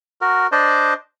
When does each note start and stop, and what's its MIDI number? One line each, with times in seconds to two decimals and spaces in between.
0.21 0.47 66
0.21 0.47 70
0.52 0.94 62
0.52 0.94 72
0.52 0.94 74
0.52 0.94 75